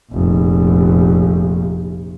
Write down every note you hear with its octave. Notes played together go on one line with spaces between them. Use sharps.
F1 A#1